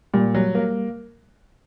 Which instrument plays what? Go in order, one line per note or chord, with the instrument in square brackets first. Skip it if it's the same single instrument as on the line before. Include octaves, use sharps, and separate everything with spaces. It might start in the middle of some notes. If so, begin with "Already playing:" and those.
[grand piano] A#2 [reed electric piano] G3
[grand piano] F#3
A#3